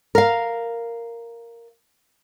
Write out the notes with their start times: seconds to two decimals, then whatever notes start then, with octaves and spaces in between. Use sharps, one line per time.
0.15 A#4 F5